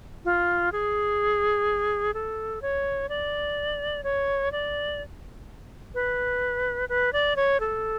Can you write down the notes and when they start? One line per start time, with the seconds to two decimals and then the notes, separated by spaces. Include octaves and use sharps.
0.25 F4
0.72 G#4
2.14 A4
2.62 C#5
3.09 D5
4.03 C#5
4.52 D5
5.94 B4
6.89 B4
7.13 D5
7.36 C#5
7.60 A4